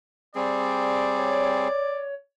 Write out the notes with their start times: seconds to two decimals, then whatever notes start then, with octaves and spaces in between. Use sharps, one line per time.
0.35 G3 C4 G#4 D5
1.18 C#5